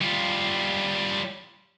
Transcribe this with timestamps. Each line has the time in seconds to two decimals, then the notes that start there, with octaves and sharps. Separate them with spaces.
0.02 G3 F4